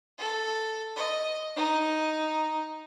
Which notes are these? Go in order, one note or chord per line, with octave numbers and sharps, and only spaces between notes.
A4
D#5
D#4